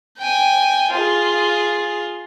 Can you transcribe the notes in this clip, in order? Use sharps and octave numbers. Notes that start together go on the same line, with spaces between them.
G5 G#5
F4 G#4